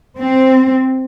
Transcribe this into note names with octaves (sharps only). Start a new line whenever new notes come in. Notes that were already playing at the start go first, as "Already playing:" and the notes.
C4